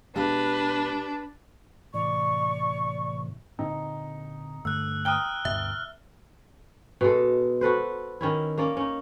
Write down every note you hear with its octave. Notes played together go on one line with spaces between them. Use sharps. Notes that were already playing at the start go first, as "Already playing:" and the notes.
B2 G#3 D4 G4 B4 F5
A2 C3 E3 D5 C#6
A#2 D3 C4 D#4
G2 D3 A3 E6 F#6
G5 A#5 D#6 F6 F#6 G7
D2 G2 B2 E5
B2 G#3 A4
F#4 A4 B4 C5
D#3 C#4 E4
A#3 C#4 D5
C#4 D#4